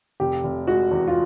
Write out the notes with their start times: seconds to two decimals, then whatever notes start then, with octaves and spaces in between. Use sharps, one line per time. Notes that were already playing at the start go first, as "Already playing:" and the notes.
0.20 F1 G4
0.43 F1
0.67 G#3 F#4
0.91 E2
1.08 F4